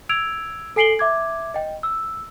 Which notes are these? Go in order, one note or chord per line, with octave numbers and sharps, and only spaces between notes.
E6 G#6 D7 F7
A4 G#5 C7 D7 F#7 G7
E5 D6 G#6
D#5 G5
E6